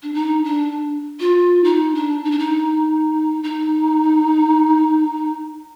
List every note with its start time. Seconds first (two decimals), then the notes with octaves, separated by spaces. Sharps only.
0.03 D4
0.14 D#4
0.44 D4
1.20 F4
1.64 D#4
1.95 D4
2.25 D#4
2.31 D4
2.39 D#4
3.43 D#4